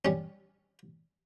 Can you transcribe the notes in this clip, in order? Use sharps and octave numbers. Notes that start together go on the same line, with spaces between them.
G3 C#4